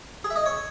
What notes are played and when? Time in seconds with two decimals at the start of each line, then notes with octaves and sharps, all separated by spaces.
0.24 G#4
0.30 E5
0.36 D#5
0.46 C#5